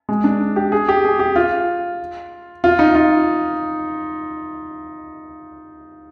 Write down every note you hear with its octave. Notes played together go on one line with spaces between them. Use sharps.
G#3
D4
G4
G#4
G4
G#4
G4
F4
F4
D#4
F4